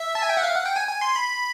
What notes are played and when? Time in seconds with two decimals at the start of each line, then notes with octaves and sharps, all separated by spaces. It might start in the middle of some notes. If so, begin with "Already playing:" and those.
Already playing: E5
0.15 A5
0.22 G#5
0.29 G5
0.37 F#5
0.43 F5
0.54 F#5
0.66 G5
0.76 G#5
0.88 G#5
1.01 C6
1.16 B5